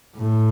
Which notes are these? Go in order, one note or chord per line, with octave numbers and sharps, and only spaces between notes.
A2